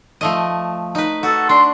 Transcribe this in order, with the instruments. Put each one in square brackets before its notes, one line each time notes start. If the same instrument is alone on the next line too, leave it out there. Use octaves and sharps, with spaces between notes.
[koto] F3 A3 D#5
D#4 B4
[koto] F#4 [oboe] A4
[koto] D4 [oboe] C6